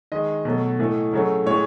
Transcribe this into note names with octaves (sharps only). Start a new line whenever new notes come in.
D#3 G#3 D#5
B2 F#3 A3
A2 E3 A3
C#3 F#3 A3
A2 E3 G#3 C#5